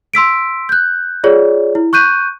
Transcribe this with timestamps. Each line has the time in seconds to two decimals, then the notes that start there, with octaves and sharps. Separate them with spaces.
0.14 C6 E6 B6 D7
0.69 F#6 G6
1.24 F4 G#4 C#5 D5
1.75 E4
1.93 C#6 F#6 G6 D#7